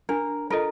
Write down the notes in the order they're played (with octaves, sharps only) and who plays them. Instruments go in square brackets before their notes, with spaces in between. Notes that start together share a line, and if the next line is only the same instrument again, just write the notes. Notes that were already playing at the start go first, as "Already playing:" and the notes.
[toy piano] D4 [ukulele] A#4
[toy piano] F4 A4 D#5 [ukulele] A#4